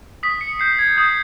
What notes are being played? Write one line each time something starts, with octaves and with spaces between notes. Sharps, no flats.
D#6 B6
C#7
G6 C7
G#6
D#6 G6